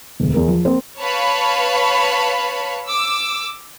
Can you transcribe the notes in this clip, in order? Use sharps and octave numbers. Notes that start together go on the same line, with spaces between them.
E1 D2
E2 A#4
F3
A#3 C4 C5
B4 C#5 F5 A5 B5
D6 E6